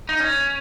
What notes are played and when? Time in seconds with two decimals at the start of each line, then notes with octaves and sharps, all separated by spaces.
0.09 D#4
0.20 C#4